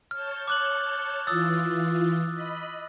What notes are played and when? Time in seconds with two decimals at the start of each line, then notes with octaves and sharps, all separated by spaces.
0.11 C#5 A5 F6 G6
0.48 D6 F#6 F#7
1.27 E3 F4 D#6 E6 A6
2.34 D#5 B5